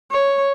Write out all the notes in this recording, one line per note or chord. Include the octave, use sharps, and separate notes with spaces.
C#5